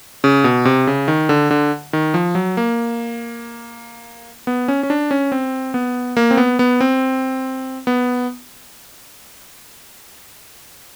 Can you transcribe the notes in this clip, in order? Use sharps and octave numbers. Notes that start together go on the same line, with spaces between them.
C#3
B2
C3
C#3
D#3
D3
D3
D#3
F3
F#3
A#3
B3
C#4
C#4
D4
C#4
C4
B3
A#3
C4
B3
B3
C4
B3